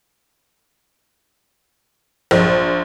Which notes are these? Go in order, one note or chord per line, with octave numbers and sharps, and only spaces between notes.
A#1